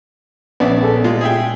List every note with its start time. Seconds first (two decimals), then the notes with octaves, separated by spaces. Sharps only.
0.60 A#1 B3 C#4 D5 E5
0.81 B3 G#4 A4
1.04 A#2 G3 G#3 F4
1.21 G#4 E5 G5